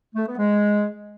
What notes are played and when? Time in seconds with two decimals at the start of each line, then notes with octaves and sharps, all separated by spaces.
0.15 A3
0.26 B3
0.37 G#3